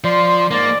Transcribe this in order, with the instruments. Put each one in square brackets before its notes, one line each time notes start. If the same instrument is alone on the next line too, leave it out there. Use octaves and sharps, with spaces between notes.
[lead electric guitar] F3 [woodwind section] D5 C6
[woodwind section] G#2 D5 [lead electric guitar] A#3